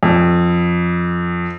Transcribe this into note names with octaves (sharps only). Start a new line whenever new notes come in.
F2